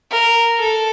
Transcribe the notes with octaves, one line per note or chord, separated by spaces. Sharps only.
A#4
A4